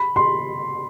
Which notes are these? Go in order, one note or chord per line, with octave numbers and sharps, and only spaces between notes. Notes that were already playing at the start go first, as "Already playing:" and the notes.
Already playing: B5
C6